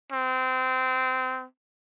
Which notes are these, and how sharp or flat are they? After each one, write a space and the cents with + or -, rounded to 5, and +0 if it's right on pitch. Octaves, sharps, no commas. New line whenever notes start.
C4 -25